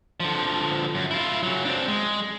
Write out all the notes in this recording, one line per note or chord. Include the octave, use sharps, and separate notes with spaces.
D3 F3
F#2
E4 F4
C#3 F#3
C4 D4
G#3